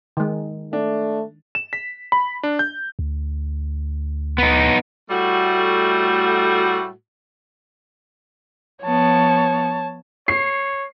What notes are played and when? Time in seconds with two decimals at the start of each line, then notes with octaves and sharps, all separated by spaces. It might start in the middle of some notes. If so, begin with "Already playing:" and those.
0.17 D#3 G#3
0.73 A3 D4
1.55 E7
1.73 B6
2.12 B5
2.43 D4
2.59 G6
2.99 D2
4.38 B3 D#4
5.10 A2 G3 A3 F#4
8.84 F3 B3 C#5 A5
10.28 C#5 C7